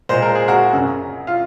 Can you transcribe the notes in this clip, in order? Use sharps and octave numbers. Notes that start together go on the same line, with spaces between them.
A#2 G#3 C5
A#4
G#4
F#4 A#4
F#2 C#3 F#3
F4